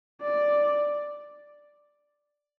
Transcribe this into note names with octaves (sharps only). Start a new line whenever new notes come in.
D5